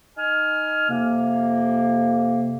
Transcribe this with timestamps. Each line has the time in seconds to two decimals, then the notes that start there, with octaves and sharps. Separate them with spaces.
0.17 D#4 G#5 F6
0.89 F2 C3 A#3